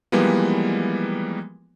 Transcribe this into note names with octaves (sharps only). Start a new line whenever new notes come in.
E3 F3 G3 G#3 A#3 B3